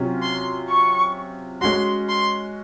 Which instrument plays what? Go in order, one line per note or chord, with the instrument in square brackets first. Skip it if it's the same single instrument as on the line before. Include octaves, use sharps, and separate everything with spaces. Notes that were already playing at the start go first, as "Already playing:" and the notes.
Already playing: [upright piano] C3 F#3 C#4 F4
[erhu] C6
C#6
[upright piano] G#3 C#4 F#4 [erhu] C6
[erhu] C6